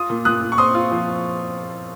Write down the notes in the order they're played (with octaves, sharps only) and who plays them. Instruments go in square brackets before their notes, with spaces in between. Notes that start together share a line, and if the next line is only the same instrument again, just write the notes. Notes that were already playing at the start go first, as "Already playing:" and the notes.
Already playing: [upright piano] F4 D#6
A#2
A#2 D#6 F#6
A#2
C#6
C4 C6 D#6
F4
F3